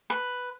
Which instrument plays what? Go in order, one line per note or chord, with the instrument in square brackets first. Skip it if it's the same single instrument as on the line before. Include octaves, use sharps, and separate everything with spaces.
[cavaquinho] B4